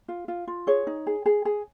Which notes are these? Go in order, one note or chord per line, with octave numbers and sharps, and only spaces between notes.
F4
F4
F4
G#4 C#5
D#4
G#4
G#4
G#4